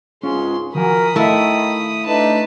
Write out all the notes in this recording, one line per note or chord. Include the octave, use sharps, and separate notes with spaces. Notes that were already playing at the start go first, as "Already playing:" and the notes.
C#2 G#2 C#4 F4 G#4 C6
D#3 F3 F#4 A#4 G#5 B5 D#6
D#3 A3 E4 E5 F5
A3 D4 D#4 B4 A5